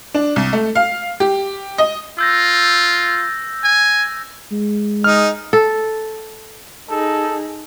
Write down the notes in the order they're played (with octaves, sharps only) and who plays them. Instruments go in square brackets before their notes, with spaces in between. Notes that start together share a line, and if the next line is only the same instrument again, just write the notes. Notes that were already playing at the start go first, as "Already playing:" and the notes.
[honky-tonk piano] D4
C2
A3
F5
G4
D#5
[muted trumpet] F4 [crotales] E6 G6 A#6
[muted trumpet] G#5
[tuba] G#3
[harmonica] D#4 G#4 [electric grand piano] F6
[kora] A4
[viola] D#4 G#4 [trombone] A4